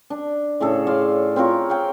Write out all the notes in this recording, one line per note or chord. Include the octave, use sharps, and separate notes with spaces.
D4
A2 C#3 G#4 A4
D5 F5 C6
C4 F4 A#4 C#5
C#5 F5 G5